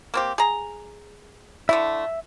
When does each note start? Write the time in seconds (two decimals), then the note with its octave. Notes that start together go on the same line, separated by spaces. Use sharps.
0.14 A#3 C4 G4
0.38 G#4 A#5
1.69 D3 A3 E4 E5